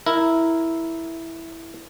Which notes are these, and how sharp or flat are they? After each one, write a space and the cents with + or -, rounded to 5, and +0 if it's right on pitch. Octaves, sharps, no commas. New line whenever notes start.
E4 +0 A#4 +0